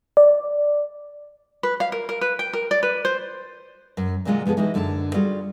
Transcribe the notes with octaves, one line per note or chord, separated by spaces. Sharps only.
D5
B4
F5
A#4
A#4
B4
G5
A#4
D5
B4
C5
F#2
A#2 D3 F#3 G#3 F4 F#5
B2 F3 B3 G#4 A4
E3 G#3 D#4 E4 F#4
F#2 D3 D4 A#4 A5
G3 F4 F#4 G#4